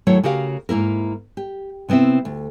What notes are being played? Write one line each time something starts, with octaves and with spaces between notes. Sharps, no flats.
D#2 F#3 A3 E4 C#5
C#3 F#4 G4 A#4 F5
G#2 A#3 E4 A#4
G4
C3 B3 C4 E4 E5
D2